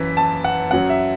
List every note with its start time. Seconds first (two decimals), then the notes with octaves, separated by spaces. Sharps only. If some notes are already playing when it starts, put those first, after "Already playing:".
Already playing: F#2 E3 B6
0.17 A5
0.44 F#5
0.71 F#2 F#3 F#5
0.90 E5